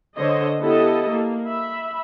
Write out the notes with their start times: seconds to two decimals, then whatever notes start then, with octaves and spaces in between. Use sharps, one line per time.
0.17 D3 C5 C#5 D#5
0.61 B3 E4 G4 A4 D#5
1.10 A#3
1.48 E5 B5